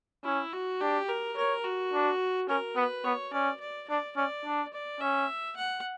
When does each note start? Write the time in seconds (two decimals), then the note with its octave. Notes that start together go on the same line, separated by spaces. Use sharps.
0.24 C#4 E4
0.53 F#4
0.81 D4 G4
1.09 A#4
1.37 A#4 C#5
1.65 F#4
1.93 D4
2.49 C#4 A#4
2.76 B3 B4
3.04 B3 C#5
3.33 C#4 D5
3.60 D5
3.89 D4 D5
4.16 C#4 D5
4.45 D4
4.73 D5
5.01 C#4 E5
5.57 F#5